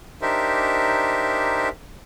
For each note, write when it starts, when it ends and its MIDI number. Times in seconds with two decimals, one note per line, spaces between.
0.22 1.69 62
0.22 1.69 63
0.22 1.69 67
0.22 1.69 70
0.22 1.69 72
0.22 1.69 76